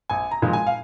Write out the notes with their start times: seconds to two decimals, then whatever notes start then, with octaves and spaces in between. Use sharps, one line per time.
0.10 A#1 G#5
0.31 A#5
0.42 A#2 F3 G#3
0.53 G#5
0.67 F5